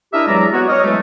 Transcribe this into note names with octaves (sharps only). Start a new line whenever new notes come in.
D4 E4 G4 A#4 D#5 E5
E2 F#3 G#3 D5 A#5
B3 F#4 C#5
C#5 D#5 F5
E3 F#3 G#3 A3